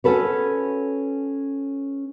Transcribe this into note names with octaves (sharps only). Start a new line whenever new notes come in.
C#4 F#4 A4 B4 C#5